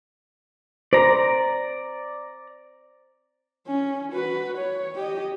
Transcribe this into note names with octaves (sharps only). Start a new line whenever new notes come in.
C5 D5 A#5
C#4
F#4 B4
C#5
G4 D#5